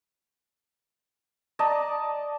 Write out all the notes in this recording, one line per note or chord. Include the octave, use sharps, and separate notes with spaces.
D5 D#5 A5 A#5